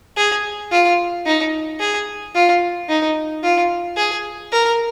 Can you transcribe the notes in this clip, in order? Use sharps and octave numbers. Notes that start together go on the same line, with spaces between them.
G#4
F4
D#4
G#4
F4
D#4
F4
G#4
A#4